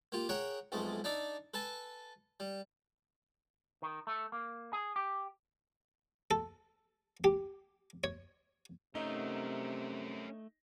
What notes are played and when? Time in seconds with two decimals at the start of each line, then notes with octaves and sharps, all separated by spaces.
0.12 A#3 F4 G4
0.29 G#4 A#4 C#5 F#5 G5
0.72 B1 F2 G#3 A3
1.04 D4 D#4 D5 E5
1.54 A4 B4 G#5 A5
2.40 G3
3.82 D#3
4.07 A3
4.32 A#3
4.73 G#4
4.96 G4
6.31 A4
7.24 G4
8.04 C#5
8.95 C3 A3 C#4 D#4 A#4